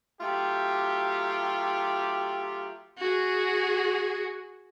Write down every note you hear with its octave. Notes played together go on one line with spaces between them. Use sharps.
F#3 A3 F4 G4
F#4 G#4